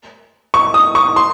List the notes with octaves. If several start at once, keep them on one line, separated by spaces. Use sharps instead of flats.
C#6
D#6
C#6
C6